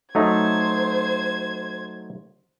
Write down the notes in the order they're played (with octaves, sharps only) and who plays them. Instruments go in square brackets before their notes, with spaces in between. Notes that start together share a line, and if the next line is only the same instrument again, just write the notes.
[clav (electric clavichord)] F#3 A3 D#4 [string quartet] C5 G#6